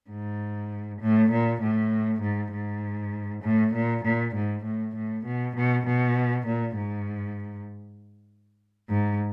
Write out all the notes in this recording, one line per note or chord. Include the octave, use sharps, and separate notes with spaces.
G#2
A2
A#2
A2
G#2
G#2
A2
A#2
A#2
G#2
A2
A2
B2
B2
B2
A#2
G#2
G#2